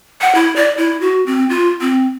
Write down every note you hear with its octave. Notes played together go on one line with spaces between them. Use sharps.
F#5
E4
D5
E4
F#4
C4
F4
C4